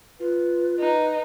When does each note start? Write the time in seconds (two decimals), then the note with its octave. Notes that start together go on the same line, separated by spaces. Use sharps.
0.20 F4 B4
0.79 D#4 B4